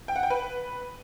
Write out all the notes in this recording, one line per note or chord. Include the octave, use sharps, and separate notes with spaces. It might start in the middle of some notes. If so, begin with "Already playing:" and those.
G5
F#5
G5
B4